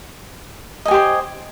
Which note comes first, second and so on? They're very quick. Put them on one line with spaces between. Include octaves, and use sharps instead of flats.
D#5 G#5 G4 C5